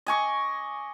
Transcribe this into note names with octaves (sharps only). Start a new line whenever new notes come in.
D#5 G#5 C#6 D6